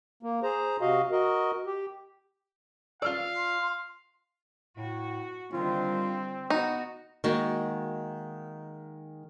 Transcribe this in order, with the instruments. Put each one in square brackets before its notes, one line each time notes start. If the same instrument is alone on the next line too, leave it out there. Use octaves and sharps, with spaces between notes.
[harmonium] A#3
G#4 C5 A#5
C3 F#4 D#5 F5
F#4 A#4 D#5
G4
[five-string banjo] F4 D5 [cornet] F5 [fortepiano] E6 F6
[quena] C6
[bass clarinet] A2 [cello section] F#4
[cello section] D3 D#3 G3 [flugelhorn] C4 [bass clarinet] F4
[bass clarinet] B3 [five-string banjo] D#4 [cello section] F#4
[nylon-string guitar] D#3 G#3 A#3 F#4